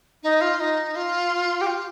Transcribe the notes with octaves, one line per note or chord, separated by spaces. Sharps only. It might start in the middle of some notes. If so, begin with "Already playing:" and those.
D#4
F4
D#4
F4
G4
F4